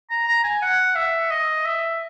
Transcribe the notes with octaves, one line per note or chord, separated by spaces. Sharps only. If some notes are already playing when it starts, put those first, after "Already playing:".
A#5
A#5
G#5
F#5
E5
D#5
E5